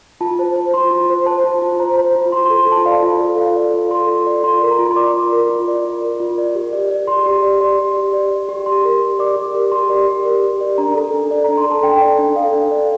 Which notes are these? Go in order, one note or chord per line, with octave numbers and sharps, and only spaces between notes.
F4 A5
C5
C5
F4 C6
F4
C5
C5 A5
F4
F4
C5 A#5
C5
F4
F4 C6
C6
A4
C6
F4 A5
D5 F5
F4
A4
F4 F5
D5
F4
A4 C6
F4
D5
F4 C6
A#4
A#5
F4
C6
D5 D6
F4
A#4
F4
D5
F4
A#4
F4
D5
G4
D5
D5
G4 C6
G4
D5
D5 C6
G4
G4
D5
D5
G4
G4 C6
A#4
G4
D5 D6
G4
A#4
G4 C6
D5
G4
A#4
G4
D5
D4 A#5
A4
D4
D5
D4 A#5
C6
A4 A5
D4 G5
D5
D4
A4 F5
D4
D5